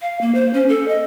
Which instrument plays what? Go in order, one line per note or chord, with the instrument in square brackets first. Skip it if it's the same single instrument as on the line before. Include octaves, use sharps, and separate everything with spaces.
[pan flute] F5
A#3
C5
C#4
A4
D#5